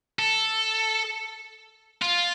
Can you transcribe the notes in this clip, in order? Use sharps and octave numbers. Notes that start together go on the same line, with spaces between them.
A4
F4